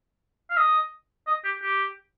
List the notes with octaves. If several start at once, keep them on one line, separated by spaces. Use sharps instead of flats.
F5
D#5
D#5
G4
G4